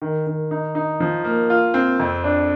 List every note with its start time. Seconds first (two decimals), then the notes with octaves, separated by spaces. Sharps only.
0.02 D#3
0.27 D#3
0.51 D#4
0.75 D#4
1.00 F3
1.24 A#3
1.50 F4
1.74 C4
1.99 F2
2.24 D4